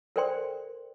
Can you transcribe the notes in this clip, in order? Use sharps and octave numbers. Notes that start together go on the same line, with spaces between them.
A4 A#4 C5 D5 G5 C6